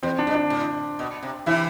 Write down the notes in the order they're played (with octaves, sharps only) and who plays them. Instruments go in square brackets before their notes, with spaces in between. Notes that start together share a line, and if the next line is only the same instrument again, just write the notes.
[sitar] E2 [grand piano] C4
[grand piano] D4
[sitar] G2
[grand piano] D4
[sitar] A2
B2
C3
[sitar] C3 E3 [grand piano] E4